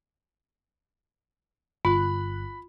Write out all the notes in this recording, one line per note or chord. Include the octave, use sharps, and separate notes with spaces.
G1 F4 B5 F#6